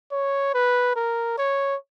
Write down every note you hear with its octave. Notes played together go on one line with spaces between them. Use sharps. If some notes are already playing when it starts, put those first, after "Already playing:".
C#5
B4
A#4
C#5